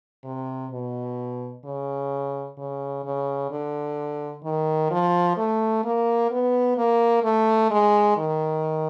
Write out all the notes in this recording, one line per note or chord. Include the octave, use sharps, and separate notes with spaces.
C3
B2
C#3
C#3
C#3
D3
D#3
F3
A3
A#3
B3
A#3
A3
G#3
D#3